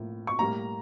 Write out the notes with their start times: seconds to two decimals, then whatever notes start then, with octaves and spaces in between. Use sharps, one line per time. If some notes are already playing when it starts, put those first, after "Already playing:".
Already playing: A2 F3 A#3
0.27 C#6
0.39 A2 G3 A#3 A#5